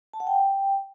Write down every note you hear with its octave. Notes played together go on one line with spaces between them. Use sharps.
A5
F#5
G5